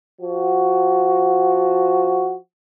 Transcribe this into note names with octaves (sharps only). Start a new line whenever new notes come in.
F3 F#4